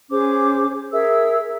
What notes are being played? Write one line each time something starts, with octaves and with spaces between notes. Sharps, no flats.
C#4 G#4 C5 D6
G#4 A#4 E5 E6